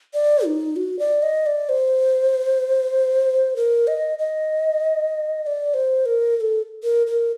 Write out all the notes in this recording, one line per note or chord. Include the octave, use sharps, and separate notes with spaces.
D5
D#4
F#4
D5
D#5
D5
C5
A#4
D#5
D#5
D#5
D5
C5
A#4
A#4
A4
A#4
A#4